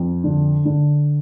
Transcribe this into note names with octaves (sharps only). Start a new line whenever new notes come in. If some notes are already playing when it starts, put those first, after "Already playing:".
Already playing: F2
D3
D3